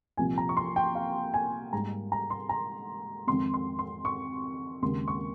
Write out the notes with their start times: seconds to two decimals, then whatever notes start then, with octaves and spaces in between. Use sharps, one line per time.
0.17 C2 A#2 F3 G#5
0.38 A#5
0.49 C#6
0.57 C6
0.76 G5
0.95 F5
1.34 G#5
1.72 G#2 G3 A#3 A#5
2.12 A#5
2.30 C6
2.49 A#5
3.27 F2 D#3 G#3 C4 C6
3.54 C6
3.79 C6
4.05 C#6
4.82 D#2 C#3 G#3 C4 C6
5.08 C#6